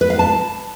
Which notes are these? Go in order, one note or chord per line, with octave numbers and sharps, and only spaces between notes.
B4
F5
A5